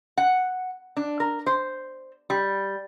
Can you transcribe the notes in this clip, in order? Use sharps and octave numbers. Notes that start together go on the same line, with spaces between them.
F#5
D4
A#4
C5
G3